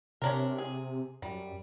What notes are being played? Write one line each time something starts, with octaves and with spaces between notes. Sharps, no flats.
C3 C#4 D4 A#4
G#4
F#2 G3